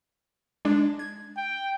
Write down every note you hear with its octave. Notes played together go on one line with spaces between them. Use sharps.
G#3 D4
G#6
G5